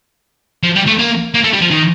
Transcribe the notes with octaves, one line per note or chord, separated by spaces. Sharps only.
F3
G3
A3
A#3
A#3
A3
G3
F3
D#3